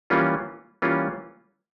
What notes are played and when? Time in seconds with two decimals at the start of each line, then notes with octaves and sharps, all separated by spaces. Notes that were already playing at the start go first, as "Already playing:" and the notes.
0.10 E3 G3 A#3 C#4 F4
0.82 E3 G3 A#3 C#4 F4